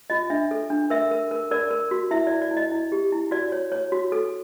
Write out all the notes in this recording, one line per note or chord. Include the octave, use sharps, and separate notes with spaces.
F4 D#5
D4 E5
A4
D4
A#4 E5
A#4
A#4
A#4 D5
A#4
F#4
E4 E5
E4 D5
D5
E4
D#5
E4
G4
E4
F#4 D5
C#5
C#5
F#4
A4